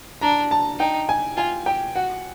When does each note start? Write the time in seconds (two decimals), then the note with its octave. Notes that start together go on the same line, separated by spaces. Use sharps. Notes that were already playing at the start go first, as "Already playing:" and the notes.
0.21 D4 A#5
0.51 A5
0.79 D#4 G5
1.09 G#5
1.37 F4 G#5
1.66 G4 G5
1.95 F#4 F#5